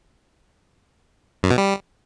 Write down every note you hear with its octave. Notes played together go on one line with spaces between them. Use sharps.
F#2
B2
G3